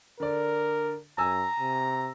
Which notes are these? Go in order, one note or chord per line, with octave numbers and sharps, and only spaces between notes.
D3 A#4 D5
F#2 G#5 A#5 E6
C3